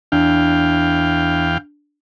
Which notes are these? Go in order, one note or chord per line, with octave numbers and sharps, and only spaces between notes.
E2 D4 F5 G5